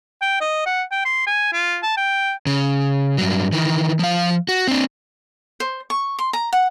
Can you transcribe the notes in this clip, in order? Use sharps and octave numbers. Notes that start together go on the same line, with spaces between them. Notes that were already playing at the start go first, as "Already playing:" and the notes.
G5
D#5
F#5
G5
C6
G#5
F4
A5
G5
C#3
G2 F#3
D#3 E3
F3 F5
F#4
C4 D4
C5
C#6
C6
A#5
F#5